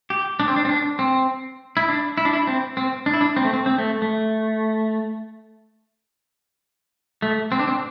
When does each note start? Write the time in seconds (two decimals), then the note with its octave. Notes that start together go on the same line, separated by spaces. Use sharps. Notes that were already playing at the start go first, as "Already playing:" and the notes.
0.10 G4
0.40 D4
0.48 C4
0.56 D4
0.65 C4
0.69 D4
0.99 C4
1.77 E4
1.89 D4
2.18 E4
2.25 D4
2.33 E4
2.47 C4
2.77 C4
3.06 D4
3.14 E4
3.21 D4
3.36 C4
3.45 A3
3.53 C4
3.66 C4
3.78 A3
4.02 A3
7.22 A3
7.52 C4
7.59 D4
7.67 C4